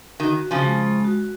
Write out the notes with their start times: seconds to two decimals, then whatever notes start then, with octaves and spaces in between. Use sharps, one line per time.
0.19 D#3 F#4
0.40 F#4
0.51 C#3 F3
0.62 G#3
0.83 G#3
1.04 F#4